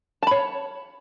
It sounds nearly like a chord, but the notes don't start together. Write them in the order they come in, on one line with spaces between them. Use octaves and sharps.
A5 B5 C#5